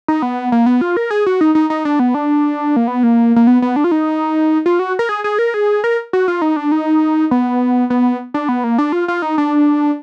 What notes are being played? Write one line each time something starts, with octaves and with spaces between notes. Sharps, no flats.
D#4
B3
A#3
B3
F4
A#4
G#4
F#4
D#4
D#4
D#4
D4
B3
D4
A#3
B3
A#3
A#3
B3
B3
D4
F4
D#4
F4
F#4
A#4
G#4
G#4
A#4
G#4
A#4
F#4
F4
D#4
D4
D#4
B3
B3
D4
B3
A#3
D4
F4
F4
D#4
D4